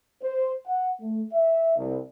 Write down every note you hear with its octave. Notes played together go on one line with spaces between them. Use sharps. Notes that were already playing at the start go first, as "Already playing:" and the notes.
C5
F#5
A3
E5
C2